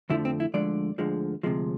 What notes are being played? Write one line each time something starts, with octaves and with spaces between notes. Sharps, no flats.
F2 D3 F3 A3 E4
C4
E4
D2 D3 F3 G#3 D5
D2 D3 F3 G#3
D2 C3 F3 G#3